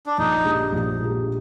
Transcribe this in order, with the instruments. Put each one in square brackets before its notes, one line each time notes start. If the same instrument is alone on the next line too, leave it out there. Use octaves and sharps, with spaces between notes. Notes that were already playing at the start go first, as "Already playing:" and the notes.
[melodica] D4
[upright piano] A#1 [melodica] D#4
[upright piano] A#2 G#3 D4 G4
A#1
A#2 G#3 D4 G4